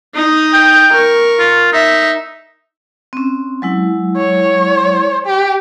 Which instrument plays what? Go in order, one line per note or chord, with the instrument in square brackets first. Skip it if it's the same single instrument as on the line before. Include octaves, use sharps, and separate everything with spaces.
[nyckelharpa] D#4 D#6
[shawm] G5
[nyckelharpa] A#4 C#6
[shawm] F4
[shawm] D#4 [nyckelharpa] E5
[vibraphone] C4 C#4
F#3 G#3 E4
[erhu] C#5
G4